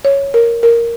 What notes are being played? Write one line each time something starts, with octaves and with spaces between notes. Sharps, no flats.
C#5
A#4
A#4